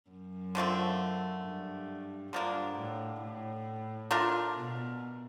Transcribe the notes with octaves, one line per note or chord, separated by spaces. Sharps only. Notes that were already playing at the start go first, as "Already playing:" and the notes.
F#2
D3 F3 A3 C4
G2
G2 D3 F3 A#3 D4
A2
A2
A3 D4 F4 A#4
B2